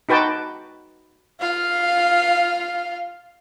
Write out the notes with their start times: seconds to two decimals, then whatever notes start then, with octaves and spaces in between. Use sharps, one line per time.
0.09 D#4 F#4 B4 G5 A5 D6
1.41 F4 F5